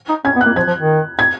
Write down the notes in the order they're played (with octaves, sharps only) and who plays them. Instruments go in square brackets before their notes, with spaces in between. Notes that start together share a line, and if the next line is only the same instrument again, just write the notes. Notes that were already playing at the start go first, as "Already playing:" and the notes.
[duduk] D#4
[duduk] C#4 [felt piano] G#6
[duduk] B3
[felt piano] F#6
[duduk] A#3
[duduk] F3 [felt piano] G#6
[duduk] F3
D#3
[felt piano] G#6